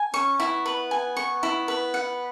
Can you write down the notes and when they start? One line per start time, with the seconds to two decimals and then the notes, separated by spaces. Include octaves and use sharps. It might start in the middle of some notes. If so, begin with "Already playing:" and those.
Already playing: G#5
0.13 C#4 C#6
0.39 B3 E4
0.66 B4
0.91 G#5
1.17 C#6
1.43 E4
1.68 B4
1.94 F#5